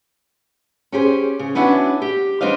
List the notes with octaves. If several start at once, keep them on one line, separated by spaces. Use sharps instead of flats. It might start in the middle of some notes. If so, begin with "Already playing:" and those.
C#4 G4 G#4 C5
C#3
B3 C#4 D4 E4 F#4
G4
G3 C4 D4 C5 D#5 F5